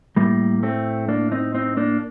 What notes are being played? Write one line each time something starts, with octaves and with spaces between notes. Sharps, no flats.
A2 G3 A#3
A3 C4
A#3 D4
C4 D#4
C4 D#4
A#3 D4